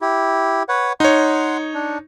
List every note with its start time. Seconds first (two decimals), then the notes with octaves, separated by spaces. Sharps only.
0.02 E4 G4
0.69 B4 C#5 F#5
1.00 D#4 C#5 F#5 C6
1.74 D4